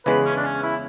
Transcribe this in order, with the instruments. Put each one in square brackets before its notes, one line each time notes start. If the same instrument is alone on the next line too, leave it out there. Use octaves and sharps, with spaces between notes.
[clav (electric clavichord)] E2 C#3 E3 G#3 [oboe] B4
[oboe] C#4
D4
C#4
E4